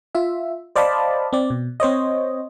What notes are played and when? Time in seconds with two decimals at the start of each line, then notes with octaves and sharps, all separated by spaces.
0.15 F4 E5
0.76 C5 D5 D#5 F5 A5 B5
1.33 C4 D5
1.50 B2
1.80 C4 C5 C#5 D#5